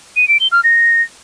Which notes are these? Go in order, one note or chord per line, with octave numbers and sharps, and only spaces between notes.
D#7
D7
G7
F6
A#6